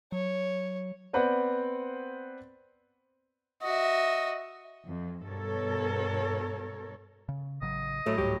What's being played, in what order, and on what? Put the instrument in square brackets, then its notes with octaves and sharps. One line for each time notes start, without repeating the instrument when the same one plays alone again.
[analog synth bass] F#3 [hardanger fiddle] C#5
[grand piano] B3 C4 B4 C5 D5 F#5
[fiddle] F#4 E5 [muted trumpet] D#5
[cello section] F2
G2 B2 A4 A#4 C#5
[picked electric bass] C#3
[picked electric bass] A1 C#3 F#3 [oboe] D#5
[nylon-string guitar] A2 F#3 [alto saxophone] A3
[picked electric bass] C#2 G#2 G3 [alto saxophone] G4